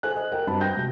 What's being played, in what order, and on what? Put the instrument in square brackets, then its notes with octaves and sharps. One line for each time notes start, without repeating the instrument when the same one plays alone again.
[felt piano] A4 C5 G#5 F#6
D#5
A#4 G5
G2 C4 F#4 A5 B5
G5 G6 A#6
C3 F#3 G#3